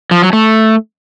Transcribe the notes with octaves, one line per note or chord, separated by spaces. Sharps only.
F3
F#3
A3